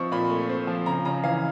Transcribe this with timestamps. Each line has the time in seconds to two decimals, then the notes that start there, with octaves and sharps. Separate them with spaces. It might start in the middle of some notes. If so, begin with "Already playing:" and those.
Already playing: F3 C4 C#6
0.12 A#2 B5
0.30 A3
0.49 C4
0.67 F3
0.86 C#3 A#5
1.05 C#3 A#5
1.24 E3 F5